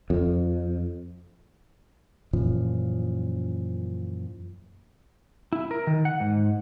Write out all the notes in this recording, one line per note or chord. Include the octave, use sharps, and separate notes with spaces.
F2
F#2 A#2 E3 F3
E4
A#4
D#3
F#5
G#2